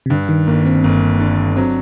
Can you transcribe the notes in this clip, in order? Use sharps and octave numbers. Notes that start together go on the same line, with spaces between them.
C3
G2 D3
D#3
G1 A#3
C4
G1 A#3
D3
F#3 C4